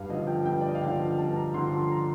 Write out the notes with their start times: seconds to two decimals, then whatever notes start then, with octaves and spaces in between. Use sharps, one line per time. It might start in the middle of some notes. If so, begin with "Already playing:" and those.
Already playing: G2 F5
0.09 D3 F3 D#5
0.27 G5
0.45 G2 G5
0.61 D5
0.68 D#5
0.75 F5
0.81 D3 F3 G5
1.18 G2 A5
1.36 A#5
1.54 D3 F3 C6
1.73 C6
1.91 A#5